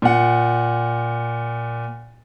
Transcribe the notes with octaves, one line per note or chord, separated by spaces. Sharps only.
A#2 F#5